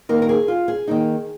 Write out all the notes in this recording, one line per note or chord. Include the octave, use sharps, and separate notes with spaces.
D#3 A#3 D#4 A#4
A#4
G#4
F4
G#4
D#3 A#3 D#4